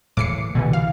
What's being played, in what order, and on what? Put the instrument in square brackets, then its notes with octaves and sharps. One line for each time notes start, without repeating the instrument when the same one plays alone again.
[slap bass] A2 C#3 E3 [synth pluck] D6 C7 C#7
[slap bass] C2 D3 [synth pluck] B2 E3
[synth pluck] F5